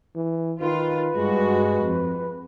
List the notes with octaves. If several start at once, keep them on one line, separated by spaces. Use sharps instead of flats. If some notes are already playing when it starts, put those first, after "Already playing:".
E3
D#3 F4 B4
G2 G#3 F#4
F2